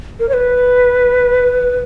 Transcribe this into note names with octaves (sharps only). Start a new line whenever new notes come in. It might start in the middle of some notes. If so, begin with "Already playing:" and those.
A#4
C#5
B4